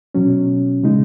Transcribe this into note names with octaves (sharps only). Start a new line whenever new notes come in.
B2 F#3 C#4
C#3 G#3 D#4